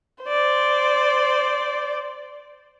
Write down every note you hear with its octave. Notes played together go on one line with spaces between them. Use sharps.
C5 D5